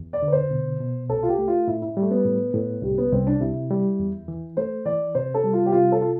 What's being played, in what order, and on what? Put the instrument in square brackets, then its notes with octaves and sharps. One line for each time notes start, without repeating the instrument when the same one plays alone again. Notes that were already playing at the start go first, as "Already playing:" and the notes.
Already playing: [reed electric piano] E2
[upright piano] D5
[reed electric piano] D3
[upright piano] B4
C5
[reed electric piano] B2
B2
[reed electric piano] C2 [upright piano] A4
[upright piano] F4
G4
[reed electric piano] A3
[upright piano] F4
[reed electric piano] A2 [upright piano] E4
[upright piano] E4
[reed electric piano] G3 [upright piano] A3
[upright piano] B3
[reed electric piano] A2
A2
[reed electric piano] C2 [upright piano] G3
[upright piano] B3
[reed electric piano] C2 [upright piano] C4
[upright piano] D4
[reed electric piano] C3 [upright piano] E4
[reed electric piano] G3
E2
E3
[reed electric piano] A3 [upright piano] C5
[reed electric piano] E3 [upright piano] D5
[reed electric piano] C3 [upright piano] C5
[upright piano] A4
[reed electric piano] G3
[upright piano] F4
G4
[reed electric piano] C3 [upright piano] F4
[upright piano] A4
[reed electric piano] F4